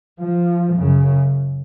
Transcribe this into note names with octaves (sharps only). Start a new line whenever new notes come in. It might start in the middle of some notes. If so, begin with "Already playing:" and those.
F3
F#2 C#3